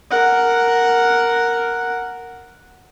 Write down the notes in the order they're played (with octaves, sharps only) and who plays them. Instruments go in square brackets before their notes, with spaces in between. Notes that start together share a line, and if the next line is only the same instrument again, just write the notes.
[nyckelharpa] A#4 F#5